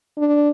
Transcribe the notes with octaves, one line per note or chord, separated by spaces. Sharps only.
D4